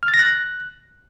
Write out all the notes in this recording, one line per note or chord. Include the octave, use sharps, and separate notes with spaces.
F6
A6
A#6
F#6